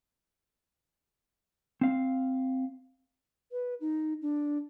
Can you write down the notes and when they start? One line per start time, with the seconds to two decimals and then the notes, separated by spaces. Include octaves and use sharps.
1.81 C4 F5
3.52 B4
3.81 D#4
4.22 D4